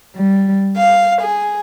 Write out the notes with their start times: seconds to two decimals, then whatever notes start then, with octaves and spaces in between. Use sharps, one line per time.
0.15 G3
0.75 F5
1.20 G#4